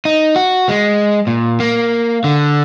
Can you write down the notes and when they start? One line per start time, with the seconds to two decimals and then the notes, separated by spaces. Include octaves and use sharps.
0.05 D#4
0.36 F#4
0.69 G#3
1.27 A#2
1.60 A#3
2.24 D3